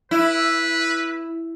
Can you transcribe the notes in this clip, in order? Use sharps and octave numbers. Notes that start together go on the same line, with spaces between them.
E4 B4